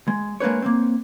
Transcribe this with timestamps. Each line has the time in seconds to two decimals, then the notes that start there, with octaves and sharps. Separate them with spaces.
0.08 G#3
0.40 G#3 A#3 D4 B4 C#5
0.62 A#3 C4